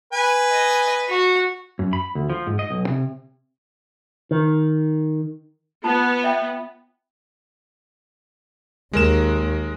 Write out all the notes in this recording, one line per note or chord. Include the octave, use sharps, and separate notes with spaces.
B4 G#5
D#5
F#4
F#2
B5
D2
F3
G#2
D#5
B1
C3
D#3
B3 F4 B4 A5
C#5 E5 G5
D#2 G#3 A#4 E7